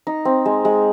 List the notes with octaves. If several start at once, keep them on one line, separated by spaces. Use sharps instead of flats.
D#4
C4
G#3
G#3